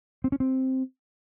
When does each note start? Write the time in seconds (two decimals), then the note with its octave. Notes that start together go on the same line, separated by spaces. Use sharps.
0.24 C4
0.32 C#4
0.40 C4